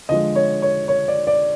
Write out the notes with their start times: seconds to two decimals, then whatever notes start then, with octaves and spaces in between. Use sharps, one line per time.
0.09 D3 F3 G#3 D#5
0.35 C#5
0.62 C#5
0.88 C#5
1.08 D5
1.27 D5